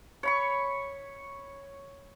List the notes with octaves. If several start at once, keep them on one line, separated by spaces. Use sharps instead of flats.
C#5 B5 C#6